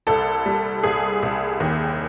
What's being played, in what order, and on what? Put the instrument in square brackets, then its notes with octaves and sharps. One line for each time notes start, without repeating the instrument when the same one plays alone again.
[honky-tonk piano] C2 A4
G3
C2 G#4
C2
D#2